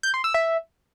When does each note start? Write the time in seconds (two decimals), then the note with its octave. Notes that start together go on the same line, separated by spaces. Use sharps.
0.03 G6
0.14 C6
0.24 E6
0.34 E5